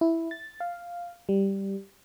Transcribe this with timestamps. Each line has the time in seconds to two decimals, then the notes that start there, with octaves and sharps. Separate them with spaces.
0.01 E4
0.31 A6
0.60 F5
1.29 G3